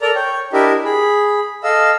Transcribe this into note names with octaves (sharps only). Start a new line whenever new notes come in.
A4 A#4 D5 A#5
C#5 G5
D4 E4 G4 A#4 D#5 E5
G#4 B5
A4 D#5 F5 E6